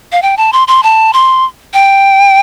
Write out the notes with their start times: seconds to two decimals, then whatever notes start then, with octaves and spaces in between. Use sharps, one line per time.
0.12 F5
0.22 G5
0.37 A5
0.53 C6
0.68 C6
0.83 A5
1.13 C6
1.74 G5